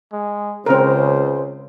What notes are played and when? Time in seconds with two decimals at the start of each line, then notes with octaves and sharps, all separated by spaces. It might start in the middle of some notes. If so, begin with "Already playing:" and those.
0.13 G#3
0.66 C#2 C#3 C4 A#4 C5